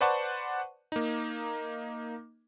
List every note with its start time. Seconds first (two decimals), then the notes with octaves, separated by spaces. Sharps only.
0.01 B4 C5 D5 F#5 A5 C#6
0.92 A#3 D#4